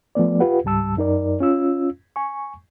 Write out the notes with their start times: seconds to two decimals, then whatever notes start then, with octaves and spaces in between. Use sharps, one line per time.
0.15 F3 A3 B3 D5
0.40 F4 G4 B4 F#5
0.64 C#2 G#2 G3 A5 E6
0.97 F#2 D#4 A#4 D5
1.40 C#4 F4 E6
2.16 G#5 C#6